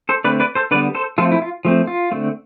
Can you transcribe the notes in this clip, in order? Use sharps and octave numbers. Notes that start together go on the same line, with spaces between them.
A4 C5
D3 A3 C4 B4 D5
B4 D5
A4 C5
D3 G3 B3 B4 D5
A4 C5
F3 A3 C4 F4 A4
E4
F4
F3 A3 C4
F4
D3 A3 C4